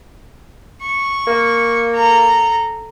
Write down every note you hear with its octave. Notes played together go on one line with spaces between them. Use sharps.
C#6
A#3
A4 A#5